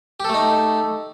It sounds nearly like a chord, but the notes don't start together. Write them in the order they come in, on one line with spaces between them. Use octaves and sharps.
G4 A4 A3 D#4